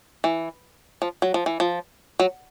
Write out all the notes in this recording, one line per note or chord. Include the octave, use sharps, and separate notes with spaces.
E3
F3
F#3
F3
E3
F3
F#3